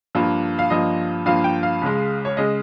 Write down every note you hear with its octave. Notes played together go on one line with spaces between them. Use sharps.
G2 F3 A#3
F5
G2 F3 A#3 D#5
G2 F3 A#3 F5
G5
F5
C#2 C#3 G#3
C#5
C#3 G#3 D#5